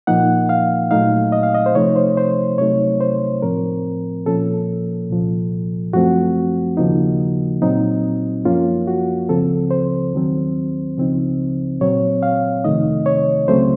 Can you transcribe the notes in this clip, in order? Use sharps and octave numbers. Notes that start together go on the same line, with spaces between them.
A#2 F3 A#3 D#4 F#5
F5
A#2 F#3 A3 D#4 F5
D#5
F5
D#5
C5
C3 F3 A3 D#4 C#5
C5
C5
C3 F#3 A3 D#4 C#5
C5
A2 F3 C4 A#4
A#2 F3 A#3 C#4 A4
C2 A#2 F3
F#2 F3 A3 C4 F#4
D#2 C#3 F3 A#3 D#4
A#2 F#3 C4 D#4
F#2 F3 A#3 C#4 F4
F#4
C#2 C#3 F3 C4 A4
C5
D#2 D#3 F#3 C4
C#2 C#3 F3 C4 D#4
A#2 F#3 C4 C#5
F5
F2 C3 D#3 A3 D#4 D#5
C#5
C#2 C#3 F#3 A3 C4 C5